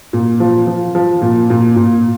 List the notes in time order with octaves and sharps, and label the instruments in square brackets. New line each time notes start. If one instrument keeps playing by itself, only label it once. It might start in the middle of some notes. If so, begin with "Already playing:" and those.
[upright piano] A#2
F3
F3
F3
A#2
A#2
A#2